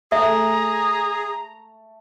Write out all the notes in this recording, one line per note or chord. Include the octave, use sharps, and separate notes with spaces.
A3 G#4 E5 A#5